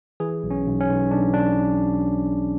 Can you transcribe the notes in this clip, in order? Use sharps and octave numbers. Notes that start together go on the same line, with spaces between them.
E3 G#4
B1
C#4
B1
C#4
B1
B1 D4
B1 D4